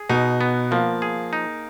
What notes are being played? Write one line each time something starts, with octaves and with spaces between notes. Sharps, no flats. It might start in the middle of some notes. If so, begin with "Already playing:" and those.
Already playing: G#4
B2 D#4
B3
F3 A#3
G#4
D#4